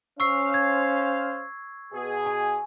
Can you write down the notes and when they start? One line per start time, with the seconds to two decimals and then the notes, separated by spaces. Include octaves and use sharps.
0.20 C#4 C5 F5 C#6 E6 C7
0.54 G#6
1.93 B2 G#4
2.26 G#5